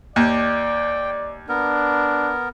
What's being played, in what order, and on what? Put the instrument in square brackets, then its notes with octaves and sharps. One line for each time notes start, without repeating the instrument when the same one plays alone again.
[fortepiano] D#2 [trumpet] D5 [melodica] G5
[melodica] B3 A#4 [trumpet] D4